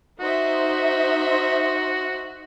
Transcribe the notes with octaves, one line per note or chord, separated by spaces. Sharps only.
D#4 F#4 C5 E5